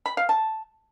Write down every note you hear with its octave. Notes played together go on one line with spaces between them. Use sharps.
B5
F5
A5